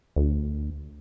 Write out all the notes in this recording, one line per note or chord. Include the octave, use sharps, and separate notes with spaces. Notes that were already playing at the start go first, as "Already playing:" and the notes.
D2